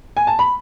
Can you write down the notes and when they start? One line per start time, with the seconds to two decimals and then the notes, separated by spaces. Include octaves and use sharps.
0.17 G#5
0.27 A5
0.39 B5